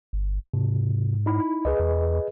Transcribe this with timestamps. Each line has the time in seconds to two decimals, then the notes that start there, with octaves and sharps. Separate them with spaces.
0.13 G1
0.54 G#2 C3
1.26 D#4 E4 B5
1.65 C#2 G#4 B4 D#5
1.79 E2